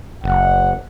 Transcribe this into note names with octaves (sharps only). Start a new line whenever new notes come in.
F#1 F#5